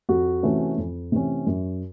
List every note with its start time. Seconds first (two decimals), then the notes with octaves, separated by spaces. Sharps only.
0.09 F2 F#4
0.43 C3 E3 A3 C#4
0.78 F2
1.12 C3 E3 A3 C#4
1.46 F#2